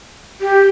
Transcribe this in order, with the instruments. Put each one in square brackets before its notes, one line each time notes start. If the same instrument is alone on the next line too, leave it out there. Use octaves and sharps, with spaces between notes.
[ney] G4